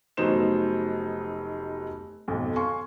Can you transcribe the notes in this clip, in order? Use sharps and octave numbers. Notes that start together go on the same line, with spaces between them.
F1 F#3 B3 D#4 C5 E7
B1 F2
F5 G#5 C6 C#6